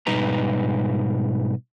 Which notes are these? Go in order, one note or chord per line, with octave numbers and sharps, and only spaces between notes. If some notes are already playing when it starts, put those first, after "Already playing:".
G#2 B2 G3 D#4 B4 A#5